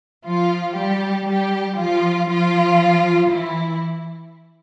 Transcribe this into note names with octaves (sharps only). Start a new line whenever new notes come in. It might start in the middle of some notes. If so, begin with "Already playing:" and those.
F3 F4
G3 G4
G3 G4
F3 F4
F3 F4
E3 E4